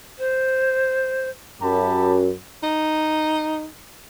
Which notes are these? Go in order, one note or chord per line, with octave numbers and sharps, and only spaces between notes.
C5
F#2 G4 A5 B5
D#4